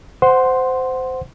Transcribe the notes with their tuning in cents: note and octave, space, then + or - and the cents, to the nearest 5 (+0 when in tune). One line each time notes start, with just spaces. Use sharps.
C5 -15 F#5 +0 C6 +0